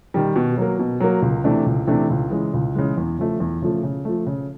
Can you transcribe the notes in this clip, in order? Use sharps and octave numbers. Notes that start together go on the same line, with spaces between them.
D#3 G3
B2
F#3 A#3
B2
F#3 A#3
C#2
C3 E3 A3 D4
C#2
C3 E3 A3 D4
C#2
C#3 E3 G#3
C#2
C#3 E3 G#3
E2
C#3 F3 A3
E2
C#3 F3 A3
C#3
F3 A3
C#3